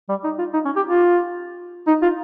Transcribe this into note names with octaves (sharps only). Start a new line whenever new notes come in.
G3
D#4
F4
D#4
C#4
G4
F4
D#4
F4